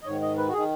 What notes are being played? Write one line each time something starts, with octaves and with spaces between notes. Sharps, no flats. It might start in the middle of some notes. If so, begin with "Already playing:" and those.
D#5
G#2 D#3 C#5
D#5
B4
F#4
D#3 G#4